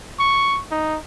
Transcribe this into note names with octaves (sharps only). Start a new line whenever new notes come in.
C#6
D#4